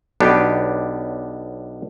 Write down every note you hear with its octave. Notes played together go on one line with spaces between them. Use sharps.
B1 B3 D4 G4